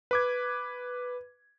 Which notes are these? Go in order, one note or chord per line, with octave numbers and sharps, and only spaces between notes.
B4 D6 G#6